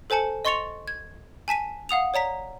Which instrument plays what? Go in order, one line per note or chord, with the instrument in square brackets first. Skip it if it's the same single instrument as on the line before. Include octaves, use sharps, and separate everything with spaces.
[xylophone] A4 C5 G#5 A5 C#7
D#5 C6 C#6 A6 C#7 F7
G#6
G#5 A5 B6 D#7
F5 F#5 D#6 F7
C#5 D5 A#5 B6